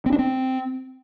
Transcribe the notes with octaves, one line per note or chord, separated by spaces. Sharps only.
C4
D4
C4